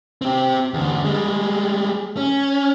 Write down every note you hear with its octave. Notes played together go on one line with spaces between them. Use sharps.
C4 G4
E2 D3
G3 G#3
C#4